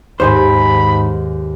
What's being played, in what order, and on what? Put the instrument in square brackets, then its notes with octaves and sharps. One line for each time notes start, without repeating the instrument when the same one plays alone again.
[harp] D#2 G#4 G#5 [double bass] G#2 [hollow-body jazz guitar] D#3 D#4 C5 [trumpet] B5